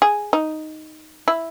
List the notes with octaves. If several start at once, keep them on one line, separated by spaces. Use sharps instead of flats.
G#4
D#4
E4